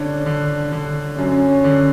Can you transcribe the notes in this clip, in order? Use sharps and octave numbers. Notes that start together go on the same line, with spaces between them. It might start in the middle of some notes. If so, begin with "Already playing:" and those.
Already playing: D3 C#4 D4
D3
D3
F#2 C#4
D3